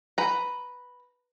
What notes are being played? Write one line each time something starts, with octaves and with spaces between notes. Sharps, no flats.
B4 A#5